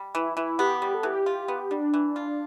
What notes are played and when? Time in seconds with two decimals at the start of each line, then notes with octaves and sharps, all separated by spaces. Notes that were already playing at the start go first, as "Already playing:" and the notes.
Already playing: G3
0.15 E3 E4
0.37 E3 E4
0.59 B3 G4
0.81 G3 G4
0.94 A4
1.03 E3 G4
1.26 F4
1.48 B3
1.71 G3 D4
1.94 E3
2.16 F4